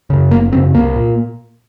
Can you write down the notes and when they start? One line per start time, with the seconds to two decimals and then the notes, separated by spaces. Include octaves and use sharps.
0.10 F#2 C#3
0.31 F#1 A#3
0.52 F#2 C#3 C4
0.74 C2 A#3
0.96 A#2